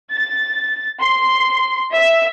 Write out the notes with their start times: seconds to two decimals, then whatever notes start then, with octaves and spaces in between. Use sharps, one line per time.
0.13 A6
1.01 C6
1.95 E5